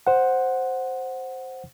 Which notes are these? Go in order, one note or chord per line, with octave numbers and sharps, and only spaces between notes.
C5 F#5